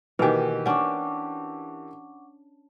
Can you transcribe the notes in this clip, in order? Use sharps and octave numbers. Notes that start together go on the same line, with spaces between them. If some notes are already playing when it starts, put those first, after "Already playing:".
B2 D#3 E3 A#3 G4 B4 G#5
C#4 D4 F#5 C#6 D6